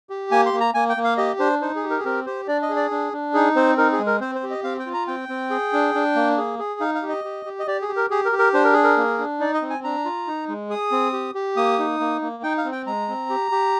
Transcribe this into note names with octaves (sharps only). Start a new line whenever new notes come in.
G4
A#3 G#5
C6
A#3
A#5
A#3 G#5
G5
A#3
F5
G4 D#5
D4 C5
D#4 C5
G#4
G4
A#4
G#4
C4 A#4
G4 C5
D4 D5
D#5
G#4
D5
D4
D4
D#4 G#4
C4 C5
D#4 A#4
G#4
G#3
A#4
C4 C5
C5
G4
D#5
C4 F5
G5
F4
A#5
C4 G5
C4
G#4
D4
D4
A#3
G#4
G#4
D#4 F5
F5
G4
D#5
G4
G4
D#5
G4 D5
G#4
G4
A#4
G4 G#4
A#4
G4
A#4
D4 C5
A#4
G#4
A#4
A#3
D4
D#4 D5
D#5
C4
G#5
D4 A#5
F4
D#4
G#3
G#4 D#6
C4
G4
G4
A#3 D#6
D#4
A#3
A#3
D#4 G5
F5
C4
G5
G#3 A#5
C4
G4
G4